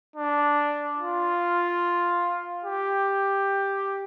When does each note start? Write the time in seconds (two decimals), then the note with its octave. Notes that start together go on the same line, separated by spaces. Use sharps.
0.16 D4
0.99 F4
2.64 G4